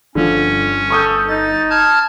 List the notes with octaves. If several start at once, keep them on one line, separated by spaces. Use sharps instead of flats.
G1 D3 F3 C#4
A4 C#6 D#6 G6
D#4 A6
A5 F6 G#6